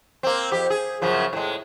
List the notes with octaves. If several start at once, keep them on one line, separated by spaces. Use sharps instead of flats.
A#3 C4
F2 G4
G#4
F#2 C#3 F3
A2 G#3